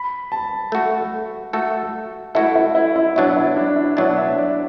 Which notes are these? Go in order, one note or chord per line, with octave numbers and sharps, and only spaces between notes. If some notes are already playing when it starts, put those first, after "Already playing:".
Already playing: B5
A5
A3 F#4 A4
A3 F#4 A4
A3 E4 F#4 A4
E4
E4
E4
B2 F#3 D4 E4
E4
D4
E4
B2 F#3 D4 E4
E5
D5